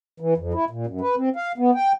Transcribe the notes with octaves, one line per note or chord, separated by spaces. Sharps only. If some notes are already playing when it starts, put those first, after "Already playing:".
E3
F2
E4
A#2
F#2
B4
C4
F5
B3
G5